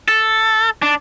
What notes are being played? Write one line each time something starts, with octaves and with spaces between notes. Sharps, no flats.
A4
D4